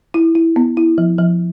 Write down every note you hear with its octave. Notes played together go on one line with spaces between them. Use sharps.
E4
E4
B3
E4
F3
F3